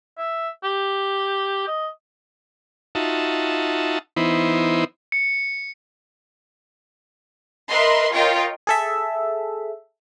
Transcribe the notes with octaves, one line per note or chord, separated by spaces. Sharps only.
E5
G4
D#5
D#4 F4 F#4 E5 A5
E3 B3 D#4 E4 C5
C#7
A#4 B4 D#5 E5 C6
F4 A#4 C#5 D#5 G5
G#4 A4 E5